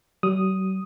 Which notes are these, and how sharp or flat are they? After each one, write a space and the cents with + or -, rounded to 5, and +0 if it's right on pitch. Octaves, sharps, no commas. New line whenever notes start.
F#3 +45 D#6 +0